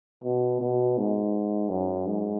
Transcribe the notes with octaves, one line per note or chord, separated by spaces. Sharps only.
B2
B2
G#2
F#2
G#2